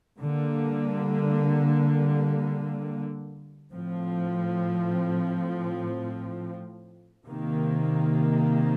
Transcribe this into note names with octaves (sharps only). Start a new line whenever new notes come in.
D3 G3 A#3
A2 F3 C4
C3 D#3 A#3